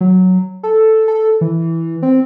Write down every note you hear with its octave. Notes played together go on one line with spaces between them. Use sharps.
F#3
A4
A4
E3
C4